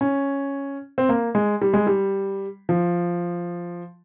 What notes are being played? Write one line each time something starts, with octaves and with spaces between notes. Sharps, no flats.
C#4
C4
A#3
G#3
G3
G#3
G3
F3